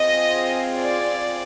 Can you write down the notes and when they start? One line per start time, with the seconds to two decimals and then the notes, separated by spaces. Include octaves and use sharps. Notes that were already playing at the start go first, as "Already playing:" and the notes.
Already playing: C4 F4 G#4 D#5
0.78 D5